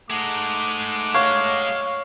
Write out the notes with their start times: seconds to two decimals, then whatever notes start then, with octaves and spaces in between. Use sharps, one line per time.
0.10 G#3 A3 D#4 F#5 D6
1.15 C#5 F5